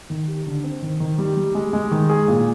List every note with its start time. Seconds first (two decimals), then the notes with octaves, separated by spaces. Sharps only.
0.10 D#3
0.27 G4
0.47 D3
0.64 C4
0.82 D#3
1.00 D#3
1.18 G3
1.37 G3
1.55 G#3
1.73 G#3
1.91 D#3
2.10 G#4
2.28 A#2